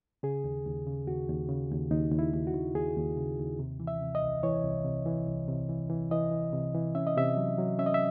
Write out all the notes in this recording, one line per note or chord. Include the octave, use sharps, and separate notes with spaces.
C#3 G#4
D#2
D#2
C#3
D#2 F#4
D#2
C#3
D#2
D#2 D#4
D#2
E4
D#2
F#4
D#2
D#2 G#4
D#2
C#3
D#2
C3
E3
E5
C3
D#5
C2
E3 C#5
C2
C3
E3
C2
C3
E3
E3
E3 D#5
E3
C3
E3
C#4 E5
D#5
C3 E5
F#3
F#3
C#4 E5
D#5
E5